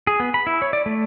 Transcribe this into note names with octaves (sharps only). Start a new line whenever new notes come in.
G#4
B3
B5
E4
C#5
D5
A3